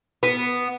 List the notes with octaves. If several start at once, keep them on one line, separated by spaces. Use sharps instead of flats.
B3